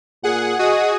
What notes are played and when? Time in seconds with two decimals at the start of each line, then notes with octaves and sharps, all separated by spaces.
0.24 A#2 G#4 F#5
0.59 F#4 G#4 D#5 D#6